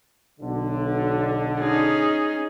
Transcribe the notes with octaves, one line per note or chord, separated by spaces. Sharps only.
B1 D3
C#4 D#4 G#4